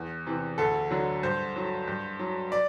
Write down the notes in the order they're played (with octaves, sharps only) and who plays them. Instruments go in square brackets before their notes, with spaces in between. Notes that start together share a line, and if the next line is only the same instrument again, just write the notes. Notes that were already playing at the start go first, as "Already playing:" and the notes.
Already playing: [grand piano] E2
C3 E3
D2 A4
D3 F#3
G2 C5
F#3
G2
F#3
D5